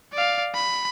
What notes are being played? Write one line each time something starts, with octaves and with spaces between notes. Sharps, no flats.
D5 F5
B5